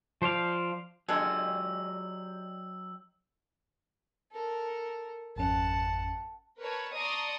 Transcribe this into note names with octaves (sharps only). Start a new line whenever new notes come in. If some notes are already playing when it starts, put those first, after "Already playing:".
F3 C5 D5 F5
D3 F#3 G#3 F4 G4 D#5 E6
A4 A#4
G#1 F2 C#4 F#5 A5
A#4 B4 C#5 A5
D5 A5 A#5 C6 C#6 D#6